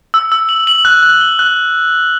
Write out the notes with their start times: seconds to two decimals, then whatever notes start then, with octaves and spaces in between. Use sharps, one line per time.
0.14 E6
0.32 E6
0.49 F#7
0.67 F#7
0.85 F#6
1.03 F#6
1.21 G7
1.39 F#6